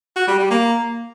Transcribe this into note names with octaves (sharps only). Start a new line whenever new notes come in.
F#4
G3
G3
A#3